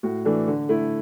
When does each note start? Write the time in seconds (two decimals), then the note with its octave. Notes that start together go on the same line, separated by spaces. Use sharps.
0.03 A2 F#4
0.25 E3 A3 D4 A4
0.48 D3
0.69 A3 E4